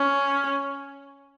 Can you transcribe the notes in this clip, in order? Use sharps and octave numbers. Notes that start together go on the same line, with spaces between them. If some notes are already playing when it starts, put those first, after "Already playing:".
Already playing: C#4